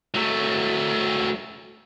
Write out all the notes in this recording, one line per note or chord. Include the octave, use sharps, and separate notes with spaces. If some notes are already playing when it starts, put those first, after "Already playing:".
F#3 A3